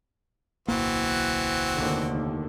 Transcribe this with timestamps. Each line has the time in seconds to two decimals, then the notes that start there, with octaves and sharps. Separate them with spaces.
0.68 D1 B1 E3 A#3 C4 F#4
1.77 F1 D#2 D3